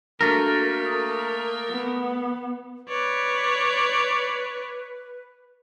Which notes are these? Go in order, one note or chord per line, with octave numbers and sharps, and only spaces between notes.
A3 A#3 D4 F#4 A4 A#4
D#6
B3
B4 C#5 D5